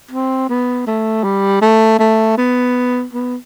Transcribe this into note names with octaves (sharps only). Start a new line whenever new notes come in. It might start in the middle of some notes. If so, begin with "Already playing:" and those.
C4
B3
A3
G3
A3
A3
B3
B3